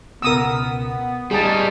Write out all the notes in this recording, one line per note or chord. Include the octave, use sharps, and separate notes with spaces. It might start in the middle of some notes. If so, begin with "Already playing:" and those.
C#2 B2 B3 A#4 D#6 E6
G#2 G3 A3 D#4 G#4 A5